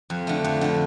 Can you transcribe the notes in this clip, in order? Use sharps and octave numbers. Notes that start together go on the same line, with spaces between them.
F2
D3 A3
F2
D3 A3